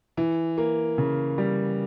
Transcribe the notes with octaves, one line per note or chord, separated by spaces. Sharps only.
E3
A#3
C#3
G3